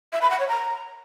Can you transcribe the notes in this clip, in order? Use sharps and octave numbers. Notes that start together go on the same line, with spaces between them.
E5
B5
F#5
C#5
A#5